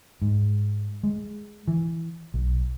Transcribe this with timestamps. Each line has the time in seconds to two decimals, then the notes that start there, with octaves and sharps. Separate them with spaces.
0.22 G#2
1.03 G#3
1.68 E3
2.34 B1